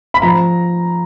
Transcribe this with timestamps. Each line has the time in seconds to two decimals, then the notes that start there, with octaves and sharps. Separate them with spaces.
0.14 B5
0.22 F3 A#5